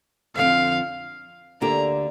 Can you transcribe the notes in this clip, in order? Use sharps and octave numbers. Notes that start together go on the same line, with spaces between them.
F2 D3 F3 C4 F5
D2 D3 A#3 D4 G4 A#5